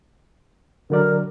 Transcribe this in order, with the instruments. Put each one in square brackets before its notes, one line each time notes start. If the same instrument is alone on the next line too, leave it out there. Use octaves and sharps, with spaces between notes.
[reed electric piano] D3 F#3 D5 [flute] A#4